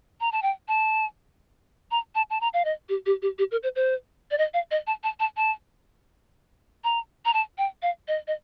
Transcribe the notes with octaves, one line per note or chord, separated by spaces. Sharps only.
A#5
A5
G5
A5
A#5
A5
A5
A#5
F5
D#5
G4
G4
G4
G4
A#4
C5
C5
D5
D#5
F5
D#5
A5
A5
A5
A5
A#5
A#5
A5
G5
F5
D#5
D#5